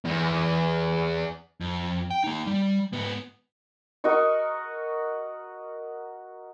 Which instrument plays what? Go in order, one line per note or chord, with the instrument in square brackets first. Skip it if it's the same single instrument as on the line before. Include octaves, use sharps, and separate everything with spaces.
[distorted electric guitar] E2
[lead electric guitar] F2
G5
A#3 D#4
G3
G#2 B3
[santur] F#4 A#4 D#5 C#6